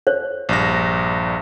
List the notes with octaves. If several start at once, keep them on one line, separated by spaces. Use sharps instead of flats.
C5 C#5
A#1 G2 A#6